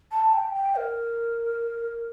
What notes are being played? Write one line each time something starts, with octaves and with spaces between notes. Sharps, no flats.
A5
G5
G5
A#4